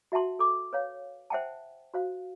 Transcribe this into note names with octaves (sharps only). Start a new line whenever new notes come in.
F#4 E5 F#5 A5 C6
A4 D6
B4 C#5 F5
C5 E5 F#5 G5 A5
F#4 C5 F5